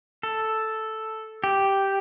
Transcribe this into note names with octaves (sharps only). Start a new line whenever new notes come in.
A4
G4